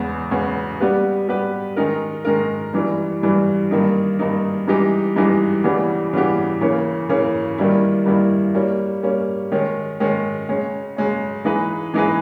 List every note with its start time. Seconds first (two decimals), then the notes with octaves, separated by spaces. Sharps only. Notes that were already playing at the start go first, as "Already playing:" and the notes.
Already playing: E2 C#3 G#3 B3
0.31 E2 C#3 G#3 B3
0.80 G3 B3 G4 B4
1.28 G3 B3 G4 B4
1.76 D#3 G#3 D#4 A#4
2.25 D#3 G#3 D#4 A#4
2.74 G2 E3 G3
3.22 G2 E3 G3
3.71 G2 D#3 A#3 D#4
4.19 G2 D#3 A#3 D#4
4.67 G2 E3 G#3 D#4 G4
5.16 G2 E3 G#3 D#4 G4
5.64 C#3 E3 G3 B3 G4
6.13 C#3 E3 G3 B3 G4
6.61 C#3 E3 A#3 C#4
7.09 C#3 E3 A#3 C#4
7.58 G2 D#3 G3 A#3 E4
8.06 G2 D#3 G3 A#3 E4
8.55 G3 A#3 C#4
9.03 G3 A#3 C#4
9.52 D#3 G#3 C#4
10.00 D#3 G#3 C#4
10.49 C#3 G#3 C#4
10.97 C#3 G#3 C#4
11.45 E3 G#3 D#4 G#4 B4
11.94 E3 G#3 D#4 G#4 B4